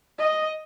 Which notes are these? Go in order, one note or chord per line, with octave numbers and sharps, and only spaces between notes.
D#5